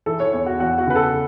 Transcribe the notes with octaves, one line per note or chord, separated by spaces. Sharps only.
E3 A4
C#5
E2 C#5
F#4
E2 F#4
F#4
C#3 B4
A4